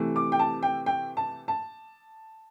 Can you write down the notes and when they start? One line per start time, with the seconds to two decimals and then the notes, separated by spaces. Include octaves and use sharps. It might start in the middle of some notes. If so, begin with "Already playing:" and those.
Already playing: C3 E3 A3
0.16 D6
0.32 G5
0.39 A5
0.63 G5
0.86 G5
1.17 A5
1.48 A5